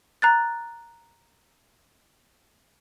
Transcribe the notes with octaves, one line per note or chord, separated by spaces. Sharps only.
A#5 F#6 A6